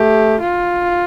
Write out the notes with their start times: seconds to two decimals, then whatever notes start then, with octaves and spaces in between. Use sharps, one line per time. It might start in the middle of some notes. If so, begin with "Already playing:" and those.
Already playing: A3 G4
0.41 F4